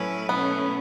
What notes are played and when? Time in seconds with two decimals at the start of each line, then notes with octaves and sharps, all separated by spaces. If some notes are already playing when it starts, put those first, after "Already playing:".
Already playing: A2 F#3 A3 C#4 E4 B4
0.29 B2 A3 B3 C#4 E4